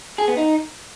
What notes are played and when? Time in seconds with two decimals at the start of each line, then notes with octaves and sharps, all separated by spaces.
0.18 G#4
0.28 B3
0.37 D#4